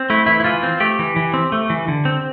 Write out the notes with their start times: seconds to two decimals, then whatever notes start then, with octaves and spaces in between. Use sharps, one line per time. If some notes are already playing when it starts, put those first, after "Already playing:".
Already playing: C4
0.10 A3 E4
0.27 E3 E4
0.40 E4
0.44 E3 F4
0.63 C4
0.80 A3 G4
0.99 E3
1.16 E3
1.34 C4
1.52 A3
1.70 E3
1.88 D3
2.05 C4